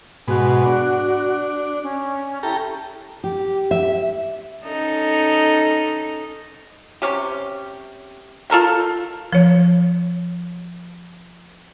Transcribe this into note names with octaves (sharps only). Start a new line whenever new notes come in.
G#2 B2 F#4
D4
C#4
E4 G4 A4 A#5
G4
E5
C#4 D#4 A4
C3 C#4 G4
F4 A4 A#4 G5
F3 C#5